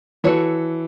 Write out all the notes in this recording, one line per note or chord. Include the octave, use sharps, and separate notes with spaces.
E3 F#4 A4 C#5